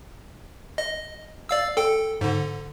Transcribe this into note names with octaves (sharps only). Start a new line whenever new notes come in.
D#5
D5 F5 E6
A4 G5
G#2 D3